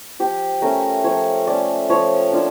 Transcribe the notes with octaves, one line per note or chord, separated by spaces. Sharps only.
F3 G4
A3 C#4 A#4
F3 C#5
A3 C#4 D5
F3 C#5
A#3 D4 F4